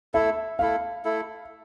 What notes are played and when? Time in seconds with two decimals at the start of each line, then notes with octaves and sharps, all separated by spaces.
0.14 A3 E4 A4 E5
0.59 A3 E4 A4 F5
1.05 A3 E4 A4